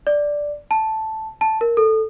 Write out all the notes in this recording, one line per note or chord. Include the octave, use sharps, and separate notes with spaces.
D5
A5
A5
A#4
A4